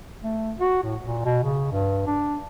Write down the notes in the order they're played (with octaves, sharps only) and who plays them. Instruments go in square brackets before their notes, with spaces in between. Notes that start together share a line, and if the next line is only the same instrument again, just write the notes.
[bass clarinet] A3
F#4
A2
A#2
B2
C#3
G2
D4